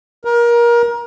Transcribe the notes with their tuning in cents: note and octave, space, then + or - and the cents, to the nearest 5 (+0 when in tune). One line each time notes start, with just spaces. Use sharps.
A#4 +25